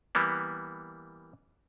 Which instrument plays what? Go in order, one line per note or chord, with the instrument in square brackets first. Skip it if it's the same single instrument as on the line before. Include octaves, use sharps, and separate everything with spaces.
[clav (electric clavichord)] E3 G3 A#3 B3